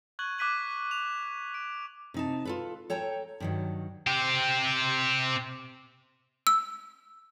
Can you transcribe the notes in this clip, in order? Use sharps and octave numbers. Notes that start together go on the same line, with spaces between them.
C#6 F#6 G#6 F#7
D6 F#6 B6 D#7 F#7
F7
D7
C3 D#4 A5
F4 A4 B4
A4 C#5 G5 A#5
G2 D#3 F#3
C4 G4
E6